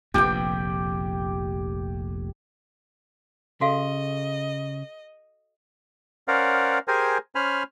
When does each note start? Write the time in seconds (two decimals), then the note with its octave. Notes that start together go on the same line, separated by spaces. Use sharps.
0.14 F1 A#1 F2 G4 G5
3.61 C#3 F#4 A4 D#5 F5
6.28 C#4 A#4 C5 D5 F5 F#5
6.88 G4 G#4 A#4 C5 G#5
7.35 C#4 C5 G#5 B5 F6